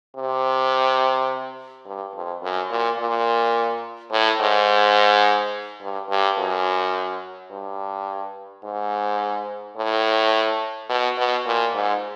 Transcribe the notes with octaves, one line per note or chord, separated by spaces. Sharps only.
C3
G2
F2
F#2
A#2
A#2
A2
G#2
G2
G2
F#2
G2
G#2
A2
B2
B2
A#2
G#2